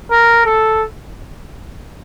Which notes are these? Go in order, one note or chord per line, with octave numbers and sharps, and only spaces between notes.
A#4
A4